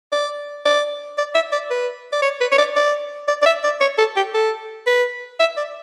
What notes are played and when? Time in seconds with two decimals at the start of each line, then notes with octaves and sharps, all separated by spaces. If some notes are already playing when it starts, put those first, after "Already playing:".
0.12 D5
0.65 D5
1.18 D5
1.35 E5
1.52 D5
1.71 B4
2.13 D5
2.22 C#5
2.41 B4
2.52 C#5
2.58 D5
2.76 D5
3.28 D5
3.42 D5
3.46 E5
3.64 D5
3.81 C#5
3.98 A4
4.16 G4
4.34 A4
4.87 B4
5.40 E5
5.57 D5